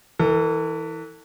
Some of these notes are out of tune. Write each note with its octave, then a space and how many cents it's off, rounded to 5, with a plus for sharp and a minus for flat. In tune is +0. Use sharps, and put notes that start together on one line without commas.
E3 -20 A4 +35